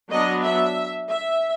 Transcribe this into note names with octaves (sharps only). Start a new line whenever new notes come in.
F#3 B3 D4 D#5
E5
E5